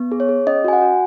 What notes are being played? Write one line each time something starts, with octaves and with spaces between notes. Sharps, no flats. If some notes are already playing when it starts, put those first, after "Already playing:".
Already playing: B3
G#4
C#5
G#4
C#4 D#5
F#4 G#5
F#5
F#4